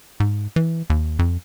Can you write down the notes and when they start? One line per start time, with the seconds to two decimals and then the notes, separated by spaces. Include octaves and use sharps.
0.20 G#2
0.56 E3
0.90 D#2
1.19 F2